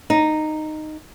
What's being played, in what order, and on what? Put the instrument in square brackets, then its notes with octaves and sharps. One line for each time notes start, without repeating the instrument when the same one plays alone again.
[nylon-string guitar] D#4